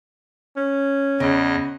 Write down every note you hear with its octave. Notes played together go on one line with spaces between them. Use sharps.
C#4
E2 C#3 D#5